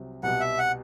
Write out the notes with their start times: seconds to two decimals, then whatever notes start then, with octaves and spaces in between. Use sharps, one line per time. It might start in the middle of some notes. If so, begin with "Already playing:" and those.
Already playing: C2 C3 F#3
0.23 C2 B2 G3 F#5
0.40 E5
0.58 F#5